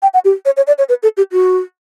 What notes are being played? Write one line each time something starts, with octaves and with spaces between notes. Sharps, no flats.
G5
F#5
G4
C#5
C#5
D5
C#5
B4
A4
G4
F#4